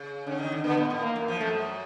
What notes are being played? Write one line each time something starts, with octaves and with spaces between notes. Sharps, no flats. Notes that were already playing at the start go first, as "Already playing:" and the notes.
Already playing: C#3
D3 C#4
D#3
D3
D3 B3
A2
A2
A#3
F#2
F3
F#2 A3